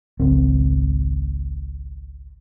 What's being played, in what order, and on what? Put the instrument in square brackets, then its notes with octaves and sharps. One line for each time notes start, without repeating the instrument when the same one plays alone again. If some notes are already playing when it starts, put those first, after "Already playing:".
[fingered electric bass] G#1 C#2 F#3 C4